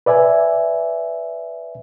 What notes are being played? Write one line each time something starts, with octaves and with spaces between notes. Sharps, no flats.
B4 D5 E5 G#5